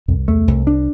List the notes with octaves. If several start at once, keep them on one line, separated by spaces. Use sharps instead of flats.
C2 F2
E2 A3
C2
D4